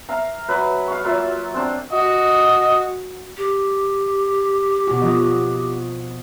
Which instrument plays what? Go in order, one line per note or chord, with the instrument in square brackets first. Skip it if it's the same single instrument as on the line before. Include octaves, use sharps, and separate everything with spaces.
[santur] E5 F5 A#5
F#3 B4
F5 C#6
F#3 A#3 F4 E5
C4 D4 C5
[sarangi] F#4 [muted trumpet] D#5
[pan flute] G4
[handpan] B2 F#4
F3 D#5